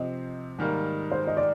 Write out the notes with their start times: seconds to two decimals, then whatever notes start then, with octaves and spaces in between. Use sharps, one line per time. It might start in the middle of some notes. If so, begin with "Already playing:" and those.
Already playing: C3 F3 C4 D#5
0.58 G#2 D#3 G3 A#3
1.12 C5
1.27 D#5
1.37 D5